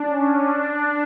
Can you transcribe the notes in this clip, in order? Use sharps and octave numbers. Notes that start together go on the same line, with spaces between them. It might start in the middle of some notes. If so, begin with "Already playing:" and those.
Already playing: D4
C#4
D4